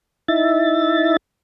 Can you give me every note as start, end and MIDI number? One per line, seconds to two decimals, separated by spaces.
0.28 1.17 63
0.28 1.17 64
0.28 1.17 76
0.28 1.17 93